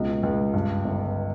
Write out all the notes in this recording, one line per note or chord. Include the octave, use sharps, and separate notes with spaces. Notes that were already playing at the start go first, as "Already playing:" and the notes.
Already playing: C#2 B2
C#2
G2
G1